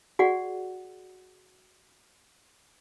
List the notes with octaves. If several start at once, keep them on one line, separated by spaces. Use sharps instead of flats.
F#4 G#4 D5 F#5